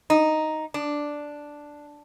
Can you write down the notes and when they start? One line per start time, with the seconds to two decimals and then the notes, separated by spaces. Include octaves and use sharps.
0.10 D#4
0.74 D4